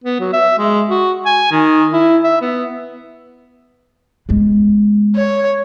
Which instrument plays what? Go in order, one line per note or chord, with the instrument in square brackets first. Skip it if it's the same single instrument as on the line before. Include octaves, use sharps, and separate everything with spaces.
[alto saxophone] B3
F#3
E5
G#3
F#4
G#5
D#3
E4
E5
B3
[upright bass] G#3 B3
[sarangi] C#5